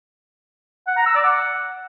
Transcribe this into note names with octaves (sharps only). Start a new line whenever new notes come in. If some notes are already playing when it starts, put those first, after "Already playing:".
F#5
A#5
E6
D5
F#5